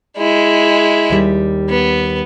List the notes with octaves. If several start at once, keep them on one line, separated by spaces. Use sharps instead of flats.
G#3 E4
D#2 G3
B3